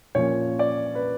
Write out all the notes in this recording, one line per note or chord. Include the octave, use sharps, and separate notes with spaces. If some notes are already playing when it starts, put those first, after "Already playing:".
A#2 F3 A#3 C#4 C#5
D5
B4